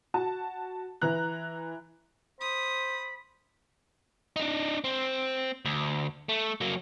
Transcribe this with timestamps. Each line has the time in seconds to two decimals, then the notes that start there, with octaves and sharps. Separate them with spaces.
0.14 F#4 A5
1.02 E3 A#5 F#6
2.41 C5 B5 D#6
4.36 D4 D#4
4.84 C4
5.65 D2
6.29 A3
6.61 F#3 A#3